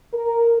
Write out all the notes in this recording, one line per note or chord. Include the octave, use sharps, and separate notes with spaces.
A#4